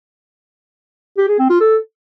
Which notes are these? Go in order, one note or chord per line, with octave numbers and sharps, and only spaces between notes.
G4
G#4
C4
F4
A4